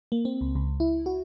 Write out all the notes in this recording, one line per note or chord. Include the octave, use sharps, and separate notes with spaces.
A#3
C4
C#2
C#2
E4
F#4